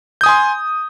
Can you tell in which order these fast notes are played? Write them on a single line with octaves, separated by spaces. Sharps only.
G6 D#6 G#5 C6